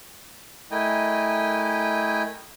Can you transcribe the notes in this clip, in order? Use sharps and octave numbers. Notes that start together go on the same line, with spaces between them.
A3 E4 A#4 D#5 G5 G#5